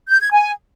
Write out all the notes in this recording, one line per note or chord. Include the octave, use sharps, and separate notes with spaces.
G6
G#6
G#5